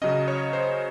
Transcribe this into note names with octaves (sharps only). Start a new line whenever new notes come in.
C#3 F#3 C#4 D#5
C#5
C5